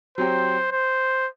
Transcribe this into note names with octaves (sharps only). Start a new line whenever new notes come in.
F#3 C4 G4 C5
C5